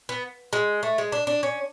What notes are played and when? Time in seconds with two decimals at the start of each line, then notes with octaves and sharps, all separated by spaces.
0.09 B3
0.53 G#3
0.83 A3
0.98 G#3
1.12 D4
1.27 D4
1.43 C#4